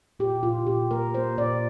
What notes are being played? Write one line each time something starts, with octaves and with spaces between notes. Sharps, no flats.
A#2 G4
A#2 F4
A#2 G4
A#3 A#4
A#3 C5
A#2 D5